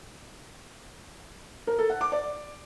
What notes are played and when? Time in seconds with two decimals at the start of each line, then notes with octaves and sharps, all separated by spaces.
1.67 A#4
1.79 A4
1.90 F#5
2.01 D6
2.12 D5